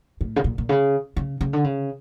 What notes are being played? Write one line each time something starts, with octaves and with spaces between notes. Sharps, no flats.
A2
C#3
A#2
A#2
C#3
C#3
C#3
D3
C#3